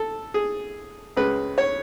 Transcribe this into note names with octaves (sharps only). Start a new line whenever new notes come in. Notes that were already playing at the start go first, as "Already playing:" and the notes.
Already playing: A4
G#4
C#2 C#3 G#3 B4
C#5